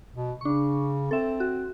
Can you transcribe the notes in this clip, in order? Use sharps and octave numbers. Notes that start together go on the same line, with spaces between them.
B2
C#3 D4 C#6
C4 A4 E5
F#4